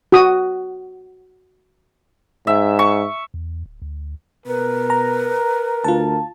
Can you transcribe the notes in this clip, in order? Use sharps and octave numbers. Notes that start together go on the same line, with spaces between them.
F#4 D#6
G#2 E5
C#6
E2
D1
D2
B2 A#4 B4
A#5
D2 F4 A5